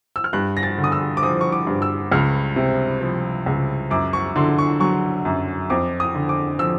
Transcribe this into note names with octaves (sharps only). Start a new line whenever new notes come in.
E6
F6
G2 F#6
A#6
A6
D3
D#6
E6
D6
F3 D#6
C#6
D6
G2
E6
C#2 F6
C3
F3
C#2
F#2 D6
C#6
D3 C6
C#6
F#3 C#6
F#2
F2 D6
D#6
D3
D6
F3 E6